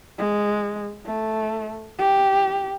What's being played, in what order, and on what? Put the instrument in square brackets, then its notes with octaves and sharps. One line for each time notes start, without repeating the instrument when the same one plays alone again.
[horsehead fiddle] G#3
A3
G4